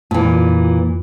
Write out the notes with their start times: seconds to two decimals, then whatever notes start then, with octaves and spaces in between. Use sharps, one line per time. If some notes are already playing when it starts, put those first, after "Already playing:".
0.11 F2 A#2 E3